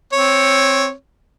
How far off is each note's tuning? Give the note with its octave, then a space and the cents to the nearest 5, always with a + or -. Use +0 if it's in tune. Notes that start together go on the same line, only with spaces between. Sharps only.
C4 +10 C#5 -5